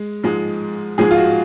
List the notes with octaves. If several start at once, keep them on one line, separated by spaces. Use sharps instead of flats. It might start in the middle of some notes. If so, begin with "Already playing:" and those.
Already playing: G#3
G#2 F3 G#3
G#2 F3 G#3 G#4
F4
F#4